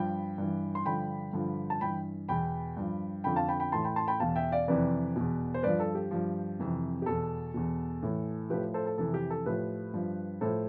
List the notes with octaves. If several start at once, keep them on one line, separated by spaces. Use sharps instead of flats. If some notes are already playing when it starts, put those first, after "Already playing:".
Already playing: G2 F3 G5 B5
G2 E3
C6
G2 D3 F3 G5 B5
G2 D3 F3
A5
G2 E3 G5 B5
E2 B2 G5 B5
G2 F3
F2 D3 F3 G5 B5
F5 A5
G5 B5
G5 B5
A2 E3 A5 C6
G5 B5
A5 C6
G5 B5
E2 B2 F5 A5
E5 G5
D5 F5
F2 C3 E3 B4 D5
E2 B2
C5
G2 F3 B4 D5
A4
G4
G2 F3
F2 C3 E3
G4
E2 B2 A4
E2 B2
A2 E3
A2 F3 G4 B4
A4 C5
A4
F2 C3 E3 A4
G4
A4
A2 F3 G4 B4
G2 F3
A2 F3 A4 C5